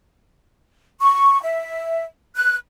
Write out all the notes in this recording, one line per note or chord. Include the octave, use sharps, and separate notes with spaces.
C#6
E5
F#6